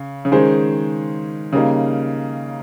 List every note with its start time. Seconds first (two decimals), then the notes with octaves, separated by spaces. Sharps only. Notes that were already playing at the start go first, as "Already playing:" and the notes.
Already playing: C#3
0.25 C#3
0.32 D#3 G#3 C#4 G#4 C5
1.53 C#3 G3 A#3 D#4